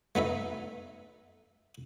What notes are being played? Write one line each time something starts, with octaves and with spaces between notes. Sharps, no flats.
A3 B3 D#4 E5